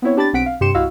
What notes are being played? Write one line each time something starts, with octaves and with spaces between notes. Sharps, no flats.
B3 C4 E4 C#5
D4 G4 A5 B5 D6 A6
B1 C4 F#5 B6 D7
F5
G2 C3 G4 C6 C#7 E7
C2 E4 F#4 D#5 F5 E6